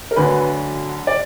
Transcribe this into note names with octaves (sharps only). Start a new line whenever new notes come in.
A#4
D2 D3 F#3 B4
D5